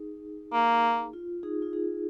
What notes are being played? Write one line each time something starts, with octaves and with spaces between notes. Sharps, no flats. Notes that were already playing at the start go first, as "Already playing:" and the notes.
Already playing: D#4 G#4
A#3
F4
D#4 G#4
F4
D#4 G#4